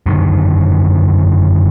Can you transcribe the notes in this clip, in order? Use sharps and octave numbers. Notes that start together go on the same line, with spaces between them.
F#2 D3 D#3